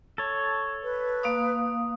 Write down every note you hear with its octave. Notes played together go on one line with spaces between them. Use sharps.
A4 C#5
B4
A#3 F5 D#6